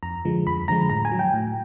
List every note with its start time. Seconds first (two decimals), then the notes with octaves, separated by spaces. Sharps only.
0.03 F2 A#5
0.25 D3 F3 G#3
0.47 F2 B5
0.68 D3 F3 G#3 A#5
0.90 A2 A#5
1.05 G#5
1.11 F#3
1.19 G5
1.34 A2